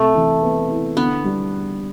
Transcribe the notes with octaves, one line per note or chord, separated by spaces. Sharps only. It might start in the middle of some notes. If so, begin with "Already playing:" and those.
Already playing: C3 A3
E3
B3
E4
D3 B3
G3